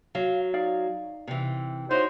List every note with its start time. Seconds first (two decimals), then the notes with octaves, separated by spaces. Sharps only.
0.15 F#3 F5
0.54 D#4 D5 F5
1.28 C3 E3
1.91 D#4 E4 F#4 C5 C#5